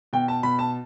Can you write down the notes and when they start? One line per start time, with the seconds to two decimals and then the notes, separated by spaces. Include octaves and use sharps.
0.13 B2 G5
0.28 A5
0.43 B2 B5
0.59 A5